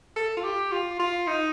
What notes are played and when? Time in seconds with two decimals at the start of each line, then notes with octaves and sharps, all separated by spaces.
0.16 A4
0.37 F4
0.44 G4
0.72 F4
1.00 F4
1.27 D#4